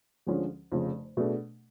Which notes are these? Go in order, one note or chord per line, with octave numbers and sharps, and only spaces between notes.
D2 D3 F3 G#3 C#4
F1 F2 C#3 F3
B2 A3 D4 G#4